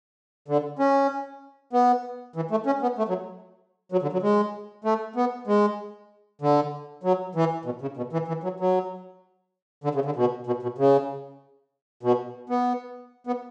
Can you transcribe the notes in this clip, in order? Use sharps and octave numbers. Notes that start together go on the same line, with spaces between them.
D3
C#4
B3
E3
A3
C#4
B3
A3
F#3
F#3
D3
F#3
G#3
A3
B3
G#3
D3
F#3
E3
B2
C#3
B2
E3
E3
F#3
F#3
D3
C#3
D3
B2
B2
B2
C#3
B2
B3
B3